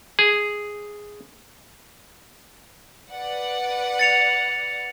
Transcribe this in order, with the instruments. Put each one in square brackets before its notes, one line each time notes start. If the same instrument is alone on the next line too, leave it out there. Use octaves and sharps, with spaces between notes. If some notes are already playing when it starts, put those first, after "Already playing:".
[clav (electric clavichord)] G#4
[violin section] B4 D5 F#5
[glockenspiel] A6 C#7 F7